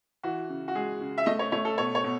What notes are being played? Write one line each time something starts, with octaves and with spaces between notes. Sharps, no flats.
E3 F#4
C#3
F#4
G#3 G#4
C#3
E5
A3 D#5
C#5
A3 C#5
A4
B2 C#5
C#5
B2